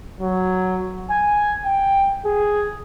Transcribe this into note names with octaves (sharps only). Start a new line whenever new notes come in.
F#3
G#5
G5
G#4